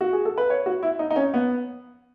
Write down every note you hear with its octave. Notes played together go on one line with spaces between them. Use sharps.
F#4
G#4
A4
B4
C#5
F#4
E4
D#4
D#4
C#4
B3